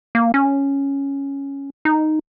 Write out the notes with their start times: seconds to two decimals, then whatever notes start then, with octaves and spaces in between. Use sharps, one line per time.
0.15 A#3
0.34 C#4
1.85 D#4